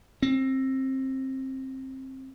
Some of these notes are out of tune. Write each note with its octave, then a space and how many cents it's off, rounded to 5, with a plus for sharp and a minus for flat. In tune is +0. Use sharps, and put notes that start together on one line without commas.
C4 +20